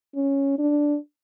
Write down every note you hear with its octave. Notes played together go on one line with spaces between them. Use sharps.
C#4
D4